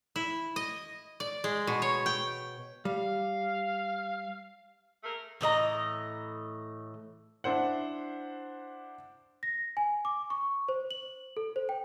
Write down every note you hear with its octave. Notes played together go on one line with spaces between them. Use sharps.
E4
D#5
D5
G#3
B2
C#5
G5
G3 F5
A3 G#4 A#4
A2 E3 D#5 A#5
D4 E4 C5 F#5
A#6
G#5
D6
C#6
C5
F#7
A4
C5
G5